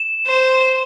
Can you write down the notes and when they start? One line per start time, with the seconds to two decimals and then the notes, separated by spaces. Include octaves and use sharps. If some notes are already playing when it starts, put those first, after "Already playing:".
Already playing: E7
0.27 C5